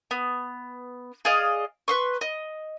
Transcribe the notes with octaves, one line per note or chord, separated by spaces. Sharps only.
B3
G#4 D5 D#5 F5
B4 C6 C#6
D#5